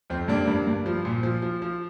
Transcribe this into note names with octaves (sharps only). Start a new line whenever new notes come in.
F2 C4
G2 A#3 D4
G2
G2
F3
A#2
F3
F3
F3